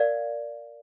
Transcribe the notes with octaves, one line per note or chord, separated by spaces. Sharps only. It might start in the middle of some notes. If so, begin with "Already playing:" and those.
Already playing: A#4 D5 F5